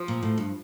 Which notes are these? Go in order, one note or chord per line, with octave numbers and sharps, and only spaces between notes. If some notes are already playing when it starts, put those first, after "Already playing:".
Already playing: F3
A#2
A2
G2